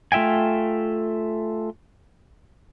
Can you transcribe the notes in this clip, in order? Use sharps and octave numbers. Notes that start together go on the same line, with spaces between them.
A3 F4 E5 G5 G#5